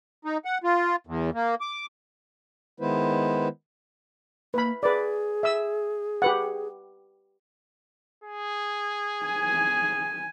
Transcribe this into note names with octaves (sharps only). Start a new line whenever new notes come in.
D#4
F#5
F4
E2
A#3
D6
D#3 G#3 B3 E4 B4 C5
A#3 B4 B5
G#4 B4 D5
E5 E6
G4 B4 F#5
G#4
G#5